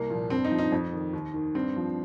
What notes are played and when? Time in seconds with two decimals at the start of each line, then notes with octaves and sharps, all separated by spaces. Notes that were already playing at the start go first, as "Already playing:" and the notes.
Already playing: C2 A#3
0.10 A#2 F3
0.30 G2 C4
0.45 D#4
0.51 F3
0.58 D#4
0.72 F2
0.93 D#3
1.13 D#2
1.34 D#3
1.55 G2 C4
1.76 F3